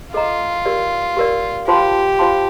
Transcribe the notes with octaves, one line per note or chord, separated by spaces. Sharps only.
F4 A4 D#5 A#5
G4 A#4 D5
G4 A#4 D5
F4 G4 C5 F5 A5 C6
F4 C5 F5 A5 C6